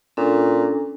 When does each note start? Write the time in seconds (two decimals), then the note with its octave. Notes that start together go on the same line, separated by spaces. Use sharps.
0.17 A#2 C#4 D4 A4